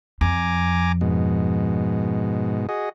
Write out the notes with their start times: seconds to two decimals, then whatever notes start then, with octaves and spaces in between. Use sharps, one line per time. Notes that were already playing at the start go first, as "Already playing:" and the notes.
0.21 F2 G#5 A#5 D6
1.01 G#2 B2
2.69 F#4 G#4 D#5